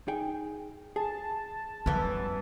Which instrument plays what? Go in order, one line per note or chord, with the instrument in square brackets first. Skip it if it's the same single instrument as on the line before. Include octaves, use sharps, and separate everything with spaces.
[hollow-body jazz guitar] D#4 G#4 G5
[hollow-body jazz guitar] G#4 [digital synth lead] A5
[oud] F#2 E3 B3 [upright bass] G3